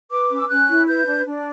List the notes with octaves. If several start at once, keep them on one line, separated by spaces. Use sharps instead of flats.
B4 D6
C#4
E6
C#4 F#6
E4
B4 G6
D4
D4